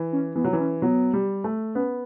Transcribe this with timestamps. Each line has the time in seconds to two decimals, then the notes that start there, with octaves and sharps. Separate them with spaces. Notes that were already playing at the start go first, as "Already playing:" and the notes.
Already playing: E3
0.13 C#4
0.36 E3 B3
0.44 F#3
0.53 E3
0.60 C#4
0.82 F#3 B3
1.13 G3
1.44 A3
1.75 B3 C#4